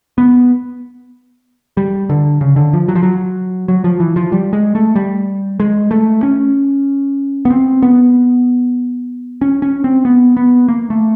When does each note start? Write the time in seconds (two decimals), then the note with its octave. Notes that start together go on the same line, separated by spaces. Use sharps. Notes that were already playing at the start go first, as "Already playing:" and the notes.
0.18 B3
1.77 G3
2.10 D3
2.41 C#3
2.56 D3
2.73 F3
2.88 F#3
2.95 F3
3.03 F#3
3.68 F#3
3.84 F3
4.00 E3
4.16 F3
4.32 G3
4.53 G#3
4.75 A3
4.95 G3
5.60 G#3
5.91 A3
6.23 C#4
7.45 B3
7.50 C4
7.82 B3
9.41 C#4
9.62 C#4
9.84 C4
10.05 B3
10.37 B3
10.68 A#3
10.90 A3